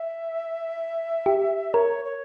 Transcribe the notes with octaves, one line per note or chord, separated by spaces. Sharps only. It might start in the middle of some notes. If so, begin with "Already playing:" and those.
Already playing: E5
G4
A#4 C#5
C#5